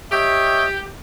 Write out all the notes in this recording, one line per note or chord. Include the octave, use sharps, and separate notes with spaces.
G4 C#5 D#5 E5